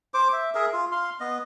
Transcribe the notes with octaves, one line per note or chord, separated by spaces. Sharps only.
C5 D6
E5
G#4 A#4 E5
F4
F5 C6
B3 D#5